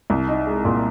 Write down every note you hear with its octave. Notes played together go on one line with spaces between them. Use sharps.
C2
D#4
G#3
A#2